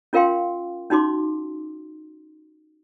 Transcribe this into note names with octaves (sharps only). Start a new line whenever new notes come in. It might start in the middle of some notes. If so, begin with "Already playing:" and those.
C#4 F4 A#4 F5 G5 C6
C#4 D#4 F#4 C6 D6